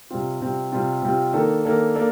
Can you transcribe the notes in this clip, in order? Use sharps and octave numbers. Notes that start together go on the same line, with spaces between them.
C3 G3 C4 F4
C3 G3 C4 F4
C3 G3 C4 F4
C3 G3 C4 F4
D#3 A#3 D4 A4
D#3 A#3 D4 A4
A#3 D4 A4